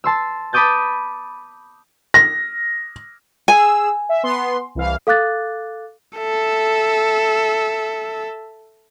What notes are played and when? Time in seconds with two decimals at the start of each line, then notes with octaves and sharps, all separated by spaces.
0.04 A5 C6 E6
0.53 A5 B5 D6 D#6 G6 A6
2.14 A#6
3.48 G#4 G#5 E6
4.09 E5
4.23 B3 C6
4.75 C2 E3 F5
5.07 A4 F5 D6 F#6 A6
6.17 A4 E5